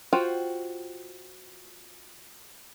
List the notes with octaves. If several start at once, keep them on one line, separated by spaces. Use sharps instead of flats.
F4 F#4 C5 G5